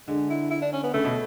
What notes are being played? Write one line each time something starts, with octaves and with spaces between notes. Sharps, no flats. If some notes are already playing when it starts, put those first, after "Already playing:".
D3 G#3
E4
E4
D4
C#4
B3
C#3 A3
B2